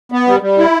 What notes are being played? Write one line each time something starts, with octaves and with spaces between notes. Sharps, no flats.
B3
G3
G3
E4